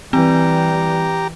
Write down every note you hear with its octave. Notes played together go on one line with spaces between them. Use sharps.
E3 G3 C4 G4 A#5